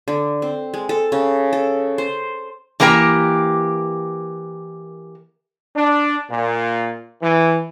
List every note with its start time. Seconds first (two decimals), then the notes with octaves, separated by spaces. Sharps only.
0.08 D3
0.42 C4
0.74 G#3
0.89 A4
1.12 C#3
1.53 A4
1.98 C5
2.80 E3 A#3 G4 A#4 A#5
5.77 D4
6.31 A#2
7.21 E3